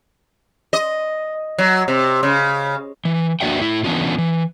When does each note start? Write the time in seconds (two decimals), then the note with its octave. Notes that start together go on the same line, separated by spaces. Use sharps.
0.73 D#5
1.58 F#3
1.88 C3
2.23 C#3
3.05 E3
3.41 A#3 D4 F#4 D5 E5 G5
3.61 A2 E4
3.84 E3 B3 C#4 D4 F4
4.18 E3